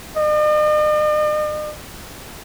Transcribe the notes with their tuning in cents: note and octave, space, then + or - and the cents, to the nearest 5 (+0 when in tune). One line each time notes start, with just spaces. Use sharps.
D#5 -45